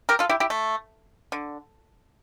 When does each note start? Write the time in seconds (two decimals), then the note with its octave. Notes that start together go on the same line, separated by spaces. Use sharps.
0.09 G4 A#4
0.19 F4 A4
0.29 E4 G4
0.40 E4 G4
0.50 A3
1.32 D3